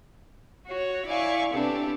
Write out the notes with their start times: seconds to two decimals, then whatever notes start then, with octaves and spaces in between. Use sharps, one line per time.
0.67 F#4 C#5
1.06 E4 D5 F5 G#5 C#6
1.52 C3 B3 C4 D4 G4 A4